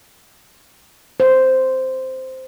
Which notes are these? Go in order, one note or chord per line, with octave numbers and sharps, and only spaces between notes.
C5